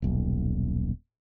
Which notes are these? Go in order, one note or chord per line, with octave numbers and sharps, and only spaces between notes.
D#1 B1